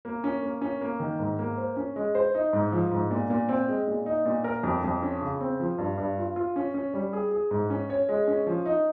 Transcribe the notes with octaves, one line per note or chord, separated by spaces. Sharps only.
A#3
C#4
A#3
C#4
A#3
D#3
G#2
A#3
C5
C#4
G#3
C5
D#4
G#2
F3
G#2
A#2
A#2
C4
G#3
A#2
D#4
A#2
A#4
F2
F2
C#4
C#3
C4
F3
G2
G2
F4
F4
C#4
C#4
G3
G#4
G#4
G#2
C#4
C#5
G#3
C#4
F3
D#4